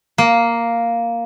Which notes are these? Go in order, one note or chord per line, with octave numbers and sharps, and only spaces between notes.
A#3